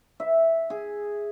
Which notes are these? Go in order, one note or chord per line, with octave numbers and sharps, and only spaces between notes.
E5
G#4